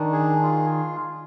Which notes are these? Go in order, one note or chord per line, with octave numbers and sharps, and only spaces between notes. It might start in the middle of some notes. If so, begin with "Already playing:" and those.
Already playing: D#3 D4
G#4
F4